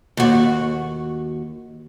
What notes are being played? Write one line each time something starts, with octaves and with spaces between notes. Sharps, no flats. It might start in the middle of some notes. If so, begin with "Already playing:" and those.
D#2 F#4